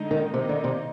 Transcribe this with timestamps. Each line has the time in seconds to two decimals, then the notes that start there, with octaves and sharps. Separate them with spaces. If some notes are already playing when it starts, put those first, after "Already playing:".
Already playing: D3 G#3 D#4
0.11 D#3
0.34 C3 D#3 A#3 D#4
0.49 D3
0.64 C3